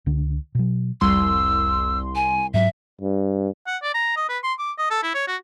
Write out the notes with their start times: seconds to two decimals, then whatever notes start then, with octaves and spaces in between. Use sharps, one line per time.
0.06 C#2 D3
0.55 B2 F#3
1.01 F1 C2 C6 E6
2.15 G#5
2.54 G#2 F#3 E5
3.01 G2
3.67 F#5
3.82 D5
3.94 A#5
4.16 D#5
4.29 B4
4.43 C6
4.59 D6
4.78 D#5
4.90 A4
5.03 E4
5.14 C#5
5.27 F#4